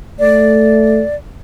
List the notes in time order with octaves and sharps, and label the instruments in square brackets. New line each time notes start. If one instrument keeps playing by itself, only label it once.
[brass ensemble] A3 [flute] D5